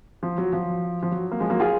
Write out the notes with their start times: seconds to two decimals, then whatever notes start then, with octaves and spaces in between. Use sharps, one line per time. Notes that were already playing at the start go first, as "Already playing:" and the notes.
0.23 F3
0.38 F#3
0.53 F3
1.03 F3
1.11 F#3
1.31 A#3
1.40 F3 G#3
1.50 F#3 A#3
1.60 F4 G#4